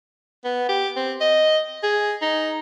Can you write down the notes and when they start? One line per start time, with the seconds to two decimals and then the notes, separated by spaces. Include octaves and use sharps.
0.45 B3
0.69 G4
0.96 C4
1.20 D#5
1.83 G#4
2.22 D#4